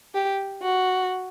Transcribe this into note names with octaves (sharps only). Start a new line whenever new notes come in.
G4
F#4